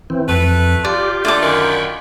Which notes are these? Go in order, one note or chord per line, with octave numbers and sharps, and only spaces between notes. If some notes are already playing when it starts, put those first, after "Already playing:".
E3 C4
F2 A3 B4
F4 G4 D5
D3 A3 D5 D6
F#2 D3 D#3 G5 B5 C#6